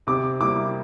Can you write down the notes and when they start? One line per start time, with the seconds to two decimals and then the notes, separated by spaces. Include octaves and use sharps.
0.07 C3 D6
0.40 G3 A#3 E4 D6